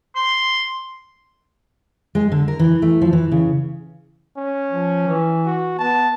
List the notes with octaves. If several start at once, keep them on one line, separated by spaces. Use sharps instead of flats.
C6
G#3
D3
A#4
E3
A3
F3
E3
C#3
C#4
F3
E3
F#4
B3 A5